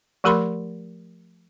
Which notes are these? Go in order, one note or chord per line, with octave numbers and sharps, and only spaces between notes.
F3 A3 G4 A#4 B5 C6